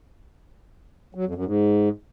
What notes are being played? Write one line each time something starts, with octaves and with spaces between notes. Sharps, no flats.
F#3
F2
F#2
G#2